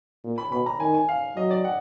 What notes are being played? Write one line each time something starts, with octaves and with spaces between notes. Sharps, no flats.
A#2
B5
B2 B5
A#5
D#3 G#5
G#5
F5
F#3 D#5
D5
F#5